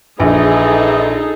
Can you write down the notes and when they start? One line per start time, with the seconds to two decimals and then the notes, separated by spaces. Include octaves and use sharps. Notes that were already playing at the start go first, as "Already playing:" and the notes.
0.20 A#1 E3 D#4 G#4 A4